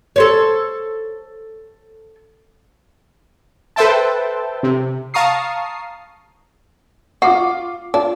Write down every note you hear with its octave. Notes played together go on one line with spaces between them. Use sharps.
A4 C5 C#5
A4 B4 C5 E5 G5 A5
C3
F5 A5 A#5 C#6 D#6 C7
F4 F#4 D6 C7
D4 F4